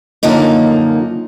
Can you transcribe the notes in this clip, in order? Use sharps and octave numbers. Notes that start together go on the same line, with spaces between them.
F#2 D3 F3 A#3 D#4